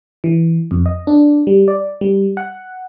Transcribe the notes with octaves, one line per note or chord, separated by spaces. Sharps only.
E3
F2
D#5
D4
G3
D5
G3
F#5